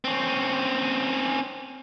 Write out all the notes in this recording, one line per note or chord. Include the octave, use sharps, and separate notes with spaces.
C4 C#4